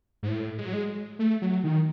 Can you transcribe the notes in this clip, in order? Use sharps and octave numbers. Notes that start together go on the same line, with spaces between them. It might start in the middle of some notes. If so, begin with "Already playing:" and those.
G#2
A2
G#3
F#3
G#3
A3
F#3
D#3